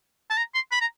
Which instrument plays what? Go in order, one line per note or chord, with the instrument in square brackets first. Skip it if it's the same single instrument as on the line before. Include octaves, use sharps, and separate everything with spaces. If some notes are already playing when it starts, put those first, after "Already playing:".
[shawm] A5
A#5
C6
B5
A#5